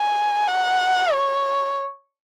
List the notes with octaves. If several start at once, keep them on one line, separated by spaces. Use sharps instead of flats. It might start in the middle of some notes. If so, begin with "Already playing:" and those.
Already playing: G#5
F#5
C#5